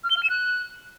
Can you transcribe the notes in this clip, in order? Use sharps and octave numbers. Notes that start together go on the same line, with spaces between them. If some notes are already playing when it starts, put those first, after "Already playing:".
F6
G7
F6
E7
F#6